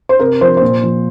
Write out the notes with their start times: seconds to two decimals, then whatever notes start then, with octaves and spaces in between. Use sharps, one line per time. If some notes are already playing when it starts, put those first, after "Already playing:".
0.09 C5
0.19 C3 A#4
0.41 F3 C5
0.57 A#2 C5
0.83 F3